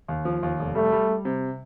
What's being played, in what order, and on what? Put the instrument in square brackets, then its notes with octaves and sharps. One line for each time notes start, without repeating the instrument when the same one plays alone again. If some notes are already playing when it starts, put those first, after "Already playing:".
[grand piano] D#2
F3
D#2
F1
[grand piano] G3 [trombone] A3
[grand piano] G3
G3
C3